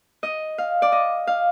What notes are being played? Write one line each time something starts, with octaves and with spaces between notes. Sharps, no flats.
D#5
F5
D5
D#5
F5